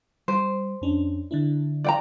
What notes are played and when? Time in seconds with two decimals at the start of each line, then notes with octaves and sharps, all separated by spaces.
0.28 G3 C5
0.81 F2 C#4 D4
1.31 D3 D4 E4
1.84 D5 G5 A#5